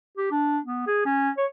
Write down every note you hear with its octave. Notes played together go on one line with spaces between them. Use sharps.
G4
D4
B3
G#4
C#4
C#5